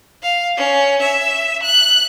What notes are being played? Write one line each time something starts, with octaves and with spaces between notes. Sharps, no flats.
F5
C#4
E5
F#6